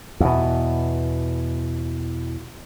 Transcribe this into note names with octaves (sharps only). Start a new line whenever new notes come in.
E2 B2